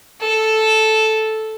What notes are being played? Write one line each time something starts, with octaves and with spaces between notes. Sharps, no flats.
A4